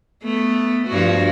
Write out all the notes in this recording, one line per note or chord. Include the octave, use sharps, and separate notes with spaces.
A3 B3
G2 F3 F#4